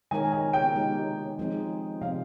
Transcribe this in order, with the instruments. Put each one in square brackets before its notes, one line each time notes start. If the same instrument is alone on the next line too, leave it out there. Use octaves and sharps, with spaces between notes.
[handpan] D#3 G#3 D#4 A#4 C#5 [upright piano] G#5
[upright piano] G#5
G5
[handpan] G#3 D#4 G4
F3 G#3 C4 D#4 G#4
[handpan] C3 F3 C4 [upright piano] F5